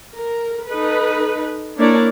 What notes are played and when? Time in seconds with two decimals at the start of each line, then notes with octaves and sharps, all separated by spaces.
0.17 A#4
0.67 D#4 A4 B4
1.78 A#3 D4 E4 A#4 C#5 D5